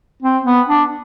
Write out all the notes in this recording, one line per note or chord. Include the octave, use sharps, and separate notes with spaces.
C4
B3
D4